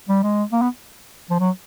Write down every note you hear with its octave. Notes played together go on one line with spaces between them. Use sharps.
G3
G#3
A#3
B3
F3
F#3